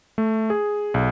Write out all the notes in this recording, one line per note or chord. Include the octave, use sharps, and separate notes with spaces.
A3
G#4
B1